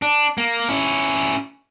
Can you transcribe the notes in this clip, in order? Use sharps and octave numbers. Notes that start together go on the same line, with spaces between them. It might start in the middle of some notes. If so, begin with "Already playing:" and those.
D4
A#3
C#4 E4